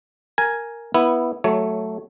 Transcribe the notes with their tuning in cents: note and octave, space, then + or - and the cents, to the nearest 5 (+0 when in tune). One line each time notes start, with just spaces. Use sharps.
A#4 +0 G#5 +0
B3 -10 E4 +0
F#3 +0 A3 +0 C#5 +15